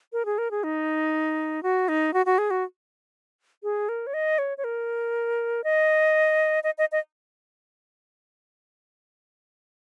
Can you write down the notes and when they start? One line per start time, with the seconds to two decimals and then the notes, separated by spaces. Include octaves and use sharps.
0.13 A#4
0.25 G#4
0.38 A#4
0.51 G#4
0.64 D#4
1.63 F#4
1.88 D#4
2.14 F#4
2.26 F#4
2.38 G#4
2.51 F#4
3.63 G#4
3.89 A#4
4.07 C#5
4.14 D#5
4.39 C#5
4.58 C#5
4.64 A#4
5.64 D#5
6.64 D#5
6.78 D#5
6.92 D#5